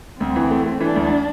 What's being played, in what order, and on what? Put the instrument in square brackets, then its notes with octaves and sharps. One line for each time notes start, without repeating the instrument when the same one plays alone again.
[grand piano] D2 [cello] C4
[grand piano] E3
A3
A3
[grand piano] E3 [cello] D4
[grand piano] D2